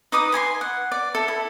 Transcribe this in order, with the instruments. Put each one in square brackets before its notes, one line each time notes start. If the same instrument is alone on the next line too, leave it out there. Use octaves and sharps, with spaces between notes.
[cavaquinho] D#4 B4 D6 D#6
B4 G#5 A#5 C6
F#5
D5
A4 E5
E4